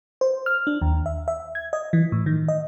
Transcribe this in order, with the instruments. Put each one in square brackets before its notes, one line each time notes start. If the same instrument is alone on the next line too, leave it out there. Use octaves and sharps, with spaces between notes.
[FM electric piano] C5
F6
D4
D#2
E5
E5
G#6
D#5
E3
A2
D#3
D#5